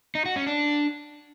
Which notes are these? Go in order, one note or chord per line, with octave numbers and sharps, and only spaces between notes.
D#4
F#4
C#4
D4